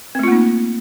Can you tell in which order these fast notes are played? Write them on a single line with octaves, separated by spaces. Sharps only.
C4 A3 F4 A#3 D#4